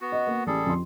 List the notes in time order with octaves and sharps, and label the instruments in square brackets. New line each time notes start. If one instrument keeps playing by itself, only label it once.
[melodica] B3 F#4
[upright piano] D#5
A#3
[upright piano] A1 [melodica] G3 G#4 A4
[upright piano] F2 C6